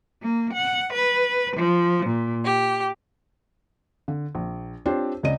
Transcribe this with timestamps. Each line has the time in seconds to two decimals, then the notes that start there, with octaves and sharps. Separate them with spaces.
0.21 A#3
0.53 F#5
0.94 B4
1.56 F3
2.05 A#2
2.45 G4
4.08 D3
4.35 A#1
4.86 C4 D4 F4 G4 C5 C#5
5.23 C#2 C#3 D5 D#5 D#7